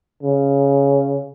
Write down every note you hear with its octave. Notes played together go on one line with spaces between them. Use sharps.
C#3